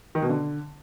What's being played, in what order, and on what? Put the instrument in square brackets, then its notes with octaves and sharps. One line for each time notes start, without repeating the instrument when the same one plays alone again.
[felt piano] D#3
B2
D3